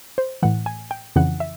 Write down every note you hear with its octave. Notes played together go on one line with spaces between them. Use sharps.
C5
A2 E3 F#5
G#5
G5
F2 C#3 E3 F#5
E5